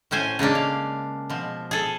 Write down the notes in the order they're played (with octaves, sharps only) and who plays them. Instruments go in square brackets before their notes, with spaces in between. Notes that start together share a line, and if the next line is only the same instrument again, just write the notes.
[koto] A2 C#4 C5 G#5
C#3 G#3 A#3 D4
F5
B2 F3
G#4 A4